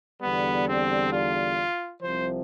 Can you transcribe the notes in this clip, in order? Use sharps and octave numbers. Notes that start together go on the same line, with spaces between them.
E2 D3 G3 B3
C4
F4
C2 C3 F3 C5